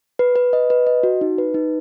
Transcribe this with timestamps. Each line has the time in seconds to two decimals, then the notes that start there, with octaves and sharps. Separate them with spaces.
0.19 B4
0.36 B4
0.53 D#5
0.70 B4
0.87 D#5
1.03 F#4
1.21 D#4
1.38 B4
1.54 D#4